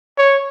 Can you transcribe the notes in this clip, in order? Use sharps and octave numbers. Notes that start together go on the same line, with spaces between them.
C#5